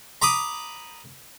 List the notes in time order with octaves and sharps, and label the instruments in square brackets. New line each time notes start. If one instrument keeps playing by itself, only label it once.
[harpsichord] A#5 B5 D6 D#6